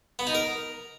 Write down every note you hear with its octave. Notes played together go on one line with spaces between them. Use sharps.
B3
D#4
A#4